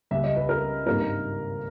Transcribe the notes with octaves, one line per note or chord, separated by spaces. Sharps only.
C#2 C#3 G3 A#3 E5
D#5
B4
A#4
G#1 G2 D#3 A#3 A#4